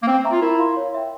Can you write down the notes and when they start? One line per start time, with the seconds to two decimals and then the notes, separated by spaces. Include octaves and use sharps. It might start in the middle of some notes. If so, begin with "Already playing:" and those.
0.03 A#3
0.07 C4 C5
0.25 E5 A#5 C#6
0.32 F4
0.42 E4 A#4
0.59 F5 C6
0.77 C#5
0.94 E5 G5